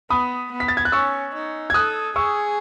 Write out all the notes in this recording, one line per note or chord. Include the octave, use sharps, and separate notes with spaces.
B3 B5 D#6
B3
B6
A6
G#6
F#6
C#4 C#6 E6
D#4
G#6
A4 D#6 F#6
G#4 C#6 E6